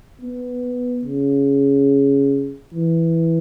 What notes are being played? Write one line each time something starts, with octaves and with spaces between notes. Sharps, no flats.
B3
C#3
E3